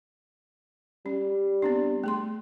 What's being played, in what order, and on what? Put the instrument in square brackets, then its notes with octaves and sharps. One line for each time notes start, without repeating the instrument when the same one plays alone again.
[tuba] G3 [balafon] C#4
[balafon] B3 C4 D4
A3 G#4 C6